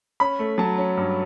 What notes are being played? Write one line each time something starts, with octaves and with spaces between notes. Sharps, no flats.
C#4 B5
A3
F#3 A5
C#4
G2